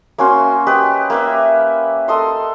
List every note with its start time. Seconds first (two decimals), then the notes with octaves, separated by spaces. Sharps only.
0.18 A#3 C#4 F#4 C6
0.67 G4 B4 D#5
1.10 A#3 B4 E5
2.08 A4 D#5 C6